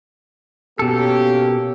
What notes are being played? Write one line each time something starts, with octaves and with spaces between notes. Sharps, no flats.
B2 A#3 C#4 G4 A4